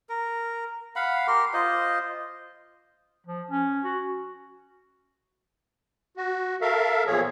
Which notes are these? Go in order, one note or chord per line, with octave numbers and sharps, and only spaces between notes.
A#4
F5 F#5 B5
G4 A#4 C6
F4 C5 D#5
F3
C#4
F#4
F#4
A4 A#4 E5 F5
E2 A#2 F3 G#4 C#5